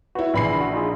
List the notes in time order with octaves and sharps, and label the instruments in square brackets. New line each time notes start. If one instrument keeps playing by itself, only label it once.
[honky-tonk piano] E4 B4 [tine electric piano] F#4
[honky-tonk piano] A#1 B5 C7 [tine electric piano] C#3 E3
[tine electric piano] F#4
D#4 F4 G#4